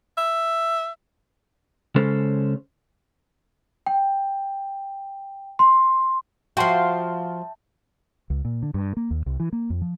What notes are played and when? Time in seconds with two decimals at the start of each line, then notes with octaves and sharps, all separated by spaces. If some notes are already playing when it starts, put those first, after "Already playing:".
0.18 E5
1.96 C#3 G#3 C#4 A4 C5
3.86 G5
5.59 C6
6.57 F3 F#4 E5 G5 A5 C6 C7
8.30 C#2
8.45 A#2
8.63 D3
8.74 G2
8.97 A#3
9.11 D#2
9.26 C2
9.40 E3
9.53 A#3
9.70 F2
9.82 F3